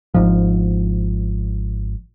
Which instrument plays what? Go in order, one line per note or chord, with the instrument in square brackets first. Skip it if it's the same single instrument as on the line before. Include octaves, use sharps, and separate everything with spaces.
[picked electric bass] G#1 G#2 F3